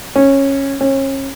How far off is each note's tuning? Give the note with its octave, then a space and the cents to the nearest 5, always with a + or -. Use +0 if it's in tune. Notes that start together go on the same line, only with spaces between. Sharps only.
C#4 -15
C#4 -35